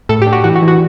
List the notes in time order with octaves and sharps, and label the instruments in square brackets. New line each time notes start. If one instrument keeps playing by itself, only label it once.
[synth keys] A2 A4
G4
D4
F#4
E3 F#4
F#4
E3
F#4